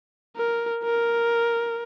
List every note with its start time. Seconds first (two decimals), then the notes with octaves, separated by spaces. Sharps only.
0.36 A#4
0.84 A#4